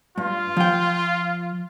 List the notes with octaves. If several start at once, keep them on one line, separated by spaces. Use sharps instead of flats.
G2 F4
F3 G5